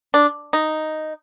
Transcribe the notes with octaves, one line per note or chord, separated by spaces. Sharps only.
D4
D#4